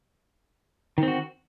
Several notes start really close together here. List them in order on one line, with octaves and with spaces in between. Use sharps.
D#3 C4 F#4